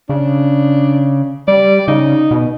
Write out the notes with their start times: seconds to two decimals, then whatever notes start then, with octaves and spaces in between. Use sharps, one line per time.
0.09 C#3 D4
1.48 G3 D5
1.88 C#3 D#4
2.31 B2